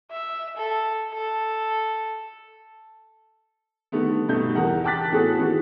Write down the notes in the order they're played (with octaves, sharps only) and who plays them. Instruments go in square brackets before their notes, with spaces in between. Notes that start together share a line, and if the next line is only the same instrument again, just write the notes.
[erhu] E5
A4
A4
[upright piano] D3 D#3 G3 A3 B3
G2 B2 A3 D#4 G6
E2 G4 A#4 F#5
G5 A5 D6 F#6 A6 B6
A2 B3 F#4 G#4 A4
D#3 E3 B3 F#4 G4